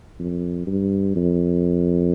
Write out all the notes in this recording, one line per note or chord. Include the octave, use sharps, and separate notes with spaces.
F2
G2
F2